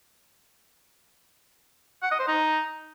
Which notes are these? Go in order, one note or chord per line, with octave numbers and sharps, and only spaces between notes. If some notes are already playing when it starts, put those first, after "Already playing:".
F#5
D#5
C5
D#4